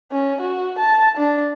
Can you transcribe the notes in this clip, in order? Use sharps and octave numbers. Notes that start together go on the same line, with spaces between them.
C#4
F#4
A5
D4